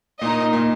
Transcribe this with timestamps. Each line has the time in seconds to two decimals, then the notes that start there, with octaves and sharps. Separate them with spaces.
0.21 A#2 D#4 A#4 D#5
0.53 A#2